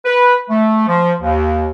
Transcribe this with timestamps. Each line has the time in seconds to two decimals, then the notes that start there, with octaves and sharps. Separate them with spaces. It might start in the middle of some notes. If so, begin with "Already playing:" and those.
0.05 B4
0.50 A3
0.88 F3
1.21 D#2